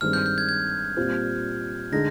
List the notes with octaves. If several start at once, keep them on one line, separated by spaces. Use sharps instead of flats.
G2 D#3 G#3 C4 F6
G6
G6
G#6
G#6
A#2 G3 C4 F4
D3 G#3 D#4 A#6